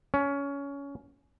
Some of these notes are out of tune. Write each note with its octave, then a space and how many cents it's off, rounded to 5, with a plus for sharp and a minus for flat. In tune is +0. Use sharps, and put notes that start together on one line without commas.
C#4 +20